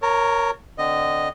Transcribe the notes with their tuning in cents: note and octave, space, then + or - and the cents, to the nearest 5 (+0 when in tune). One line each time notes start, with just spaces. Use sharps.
A#4 +0 C#5 +0 A5 +45
D3 +0 C4 -30 D#5 -5